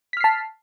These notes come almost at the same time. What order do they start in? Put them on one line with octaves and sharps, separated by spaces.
B6 F6 C7 A5